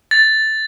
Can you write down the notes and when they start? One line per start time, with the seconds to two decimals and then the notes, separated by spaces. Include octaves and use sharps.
0.11 A6